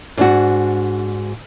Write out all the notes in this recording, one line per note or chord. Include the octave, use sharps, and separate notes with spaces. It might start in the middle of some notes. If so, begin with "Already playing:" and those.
G#2 D4 F#4